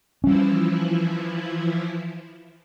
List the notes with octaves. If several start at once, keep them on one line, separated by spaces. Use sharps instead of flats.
E3 F3 G3 C#4 E4